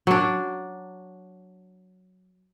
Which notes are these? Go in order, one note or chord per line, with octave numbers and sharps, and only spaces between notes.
F#3 D4